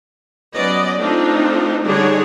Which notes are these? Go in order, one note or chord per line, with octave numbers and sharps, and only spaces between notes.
F#3 B3 C#4 D5 D#5
A3 C4 D4 D#4 F4 A4
D3 G3 D4 D#4 G#4 C#5